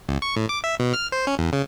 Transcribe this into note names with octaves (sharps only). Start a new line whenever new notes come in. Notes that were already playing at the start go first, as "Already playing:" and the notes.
C#2
C#6
A2
D6
E5
B2
F6
C5
C#4
E2
C#3